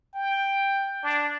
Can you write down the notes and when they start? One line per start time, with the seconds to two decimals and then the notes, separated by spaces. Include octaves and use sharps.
0.15 G5
1.03 D4